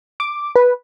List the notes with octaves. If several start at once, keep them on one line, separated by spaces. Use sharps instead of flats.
D6
B4